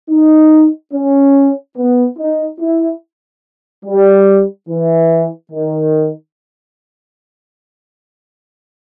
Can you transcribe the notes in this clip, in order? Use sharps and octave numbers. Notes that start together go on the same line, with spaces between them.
D#4
C#4
B3
D#4
E4
G3
E3
D#3